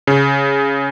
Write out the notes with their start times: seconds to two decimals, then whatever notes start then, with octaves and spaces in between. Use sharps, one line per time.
0.07 C#3